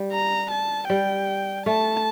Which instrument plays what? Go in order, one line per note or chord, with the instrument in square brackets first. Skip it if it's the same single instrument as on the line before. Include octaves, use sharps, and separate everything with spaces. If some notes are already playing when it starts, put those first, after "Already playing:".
Already playing: [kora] G3
[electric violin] A#5
A5
[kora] G3 [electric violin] G5
[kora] A3 [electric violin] A5